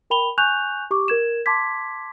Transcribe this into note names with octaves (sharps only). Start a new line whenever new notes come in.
A#4 G5 B5 F7 G7
G#5 C#6 F#6 G6 F7
G4 C#6 D6
A#4 G#6 E7
A5 C6 D6 G#6 B6